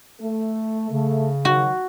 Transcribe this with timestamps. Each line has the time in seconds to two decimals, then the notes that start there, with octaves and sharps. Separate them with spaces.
0.20 A3
0.91 C#3 A3
1.45 D#3 F#3 F#4